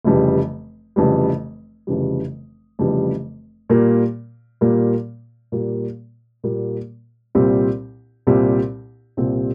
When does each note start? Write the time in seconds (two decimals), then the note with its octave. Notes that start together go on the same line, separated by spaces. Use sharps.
0.05 F1 F2 C#3 E3 G3
0.96 F1 F2 C#3 E3 G3
1.87 F1 F2 C#3 E3 G3
2.79 F1 F2 C#3 E3 G3
3.69 A#2 G3 A#3
4.61 A#2 G3 A#3
5.52 A#2 G3 A#3
6.44 A#2 G3 A#3
7.35 C2 A#2 G3 C4
8.27 C2 A#2 G3 C4
9.17 C2 A#2 G3 C4